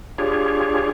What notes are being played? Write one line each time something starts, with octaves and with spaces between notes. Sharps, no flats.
D4 F4 G4 G#4 C#5